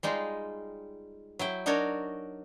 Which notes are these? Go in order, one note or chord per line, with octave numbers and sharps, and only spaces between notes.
G3 G#3 D#4 F4
F#3 E4 G5
D4 D#4 F#4 A#4 C#5 D5